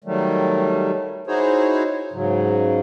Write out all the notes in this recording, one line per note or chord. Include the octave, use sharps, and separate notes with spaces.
D#3 F#3 G3 A3
D#4 E4 F#4 G#4 C5 C#5
G#2 C#3 F#3